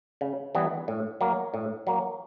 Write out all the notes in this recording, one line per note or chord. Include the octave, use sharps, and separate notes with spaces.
C#3
E3 G3 B3
A2
F#3 A#3
A2
F#3 A#3